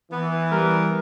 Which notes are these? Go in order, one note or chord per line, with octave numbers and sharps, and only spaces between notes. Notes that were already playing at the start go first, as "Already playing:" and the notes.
E3 B3
G3 A#4